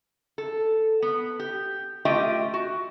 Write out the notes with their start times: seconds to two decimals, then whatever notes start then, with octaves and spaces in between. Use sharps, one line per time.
0.38 A4
1.02 B3
1.39 G4
2.05 A3 F4 G4 D#5 E5 G5
2.54 F#4